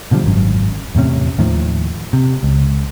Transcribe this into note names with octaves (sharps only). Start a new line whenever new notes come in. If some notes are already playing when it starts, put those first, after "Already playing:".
B2 D3 F3 G3
G#1 F#2
E2 A2 C3 C#4
D#2 A2 D#3 F3
C3
C#2